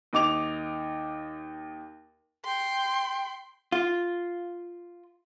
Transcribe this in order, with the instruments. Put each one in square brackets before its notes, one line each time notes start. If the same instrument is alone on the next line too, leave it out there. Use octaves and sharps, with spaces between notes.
[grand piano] D#2 D#4 D6 F7
[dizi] G5 [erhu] C6
[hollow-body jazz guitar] F4